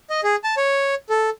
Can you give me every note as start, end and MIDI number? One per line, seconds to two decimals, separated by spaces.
0.10 0.21 75
0.23 0.36 68
0.44 0.55 81
0.57 0.95 73
1.09 1.30 69